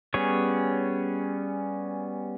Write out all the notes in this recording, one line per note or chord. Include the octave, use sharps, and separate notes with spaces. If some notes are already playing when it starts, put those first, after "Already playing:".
G3 B3 C#4 G#4 C#5